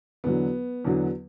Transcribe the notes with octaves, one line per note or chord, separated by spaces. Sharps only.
E2 D3 F#3 B3
E2 D3 F#3